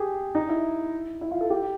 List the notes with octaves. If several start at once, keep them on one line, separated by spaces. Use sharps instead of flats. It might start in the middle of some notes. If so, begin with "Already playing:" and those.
Already playing: G4 G#4
D#4
E4
E4
F4
A4
G4